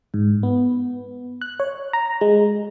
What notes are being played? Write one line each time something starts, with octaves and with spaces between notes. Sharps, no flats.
G#2
B3
F#6
C#5
A#5
G#3